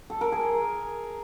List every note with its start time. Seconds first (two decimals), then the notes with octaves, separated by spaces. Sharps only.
0.10 A4
0.21 A#4
0.32 G#4